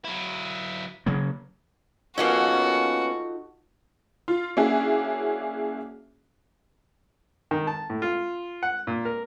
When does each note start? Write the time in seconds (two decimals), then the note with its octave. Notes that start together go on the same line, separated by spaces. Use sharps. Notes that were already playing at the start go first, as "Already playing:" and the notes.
0.04 F#3 E4
1.06 C#3 F#3 A#3
2.18 A#3 B3 C#4 D#4 F4 F#4 A4
4.28 F4
4.57 A#3 C#4 D4 E4 F#4 G#4
7.51 D#3
7.67 A5
7.90 A2
8.02 F4
8.63 F#5
8.87 A#2
9.05 A#4